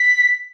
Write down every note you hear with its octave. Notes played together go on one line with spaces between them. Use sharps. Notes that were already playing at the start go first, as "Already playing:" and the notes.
Already playing: B6